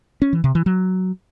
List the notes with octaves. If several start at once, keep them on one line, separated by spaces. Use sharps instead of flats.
C#4
E3
C3
E3
F#3